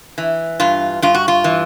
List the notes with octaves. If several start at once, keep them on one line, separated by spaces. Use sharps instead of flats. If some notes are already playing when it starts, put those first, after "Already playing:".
E3
G2 F4
G2 F4
F#4
F4
E3